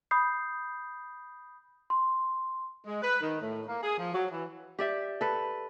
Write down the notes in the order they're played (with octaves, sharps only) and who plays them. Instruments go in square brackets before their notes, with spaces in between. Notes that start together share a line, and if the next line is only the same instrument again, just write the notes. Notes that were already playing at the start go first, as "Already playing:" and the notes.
[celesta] B5 D#6 G6 C7
C6
[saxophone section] G#3
B4
D#3
A2
A#3
G#4
F3
F#3
E3
[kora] G4 D5 E5 G5
A4 B4